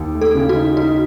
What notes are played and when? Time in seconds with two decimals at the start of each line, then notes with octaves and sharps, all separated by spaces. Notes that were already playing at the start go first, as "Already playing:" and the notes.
Already playing: D#2
0.15 A3
0.21 A4
0.35 C#3
0.49 F#4
0.56 D#4
0.77 D#4 F#4